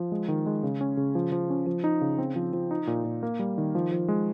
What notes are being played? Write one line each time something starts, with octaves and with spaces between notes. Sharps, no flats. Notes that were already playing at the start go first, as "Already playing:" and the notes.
Already playing: F3
G#3
D#3
G#3
C#3
C#4
C#3
F3
F3
C#4
F3
D#4
C#3
C4
F3
F3
D#4
A#2
A#2
A#3
G3
D#3
F3
F3
G#3